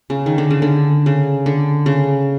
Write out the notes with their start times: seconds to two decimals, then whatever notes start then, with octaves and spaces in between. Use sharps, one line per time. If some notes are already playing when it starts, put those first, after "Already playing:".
0.10 C#3
0.26 D#3
0.38 D3
0.51 C#3
0.62 D3
1.06 C#3
1.46 D3
1.86 C#3